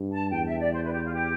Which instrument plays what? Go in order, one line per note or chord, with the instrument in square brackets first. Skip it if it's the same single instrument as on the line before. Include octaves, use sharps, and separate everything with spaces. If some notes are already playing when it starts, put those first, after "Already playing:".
Already playing: [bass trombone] G2
[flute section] A5
[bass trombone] E2 [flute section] G5
[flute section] E5
D5
C5
B4
G4
F4
G4